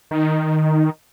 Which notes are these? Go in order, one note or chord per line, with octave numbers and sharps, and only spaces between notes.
D#3